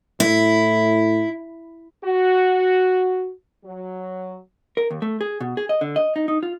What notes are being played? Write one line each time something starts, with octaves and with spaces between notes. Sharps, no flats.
A2 E4
F#4
F#3
A#4
D#2
A3
G#4
B2
G#4
D#5
D3
D#5
D#4
D#4
F4